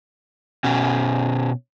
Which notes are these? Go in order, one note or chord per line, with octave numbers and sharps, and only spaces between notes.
B2 C#4